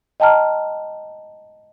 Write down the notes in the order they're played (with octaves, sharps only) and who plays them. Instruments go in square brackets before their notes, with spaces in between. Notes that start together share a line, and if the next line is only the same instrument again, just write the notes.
[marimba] D#5 G5 A5 A#5 F6